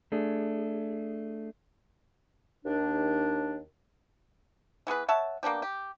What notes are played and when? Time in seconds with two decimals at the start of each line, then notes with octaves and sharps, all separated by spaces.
0.12 A3 D4 G#4
2.65 D#2 D4
4.87 E3 B3 G#4 B4
5.08 C#5 E5 F#5 A5
5.43 A#3 B3 D4 G4
5.62 G4